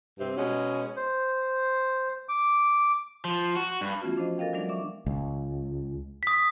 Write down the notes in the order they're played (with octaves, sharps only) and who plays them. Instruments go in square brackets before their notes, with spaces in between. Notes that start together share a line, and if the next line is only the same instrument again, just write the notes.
[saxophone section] G2 C3 C4
B2 G#3 C#4
[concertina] C5
D6
[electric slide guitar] F3
F#4
G2
[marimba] E3 A3 B3 C#4 F4 F#4
F3 D4 C5 D#5
A4 A#4 D#5 F5 G5
E3 F#3 G#3 D4 D5
D5 E5 C#6 D6
[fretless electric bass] C#2
[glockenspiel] D#6 B6